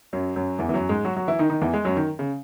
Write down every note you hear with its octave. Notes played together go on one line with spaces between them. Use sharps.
F#2 F#3
F#2 F#3
E2 E3
E3
F#2 F#3
G#2 G#3
F#3 F#4
F#3 F#4
E3 E4
D#3 D#4
D#3 D#4
E2 E3
G#3
F#2 F#3
D#3
C#3